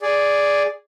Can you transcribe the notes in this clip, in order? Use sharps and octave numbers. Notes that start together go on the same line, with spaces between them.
G#4 D5